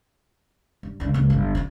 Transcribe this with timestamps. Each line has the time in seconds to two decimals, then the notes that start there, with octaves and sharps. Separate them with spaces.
0.83 G2
1.00 C#2 D3
1.14 C#2 A#3
1.30 G1
1.55 F3 F4